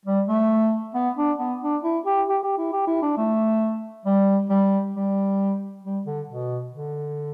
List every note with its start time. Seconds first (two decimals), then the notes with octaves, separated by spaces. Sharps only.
0.06 G3
0.28 A3
0.95 B3
1.17 D4
1.39 B3
1.62 D4
1.83 E4
2.06 G4
2.28 G4
2.43 G4
2.58 E4
2.73 G4
2.87 E4
3.02 D4
3.17 A3
4.06 G3
4.50 G3
4.95 G3
5.84 G3
6.06 D3
6.28 B2
6.72 D3